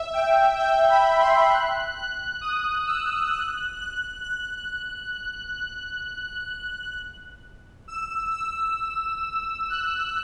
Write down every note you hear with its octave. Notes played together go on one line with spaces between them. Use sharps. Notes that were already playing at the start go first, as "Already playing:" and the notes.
Already playing: E5
G5
G5
B5
C6
F#6
F#6
D#6
E6
F#6
F#6
F#6
E6
E6
F#6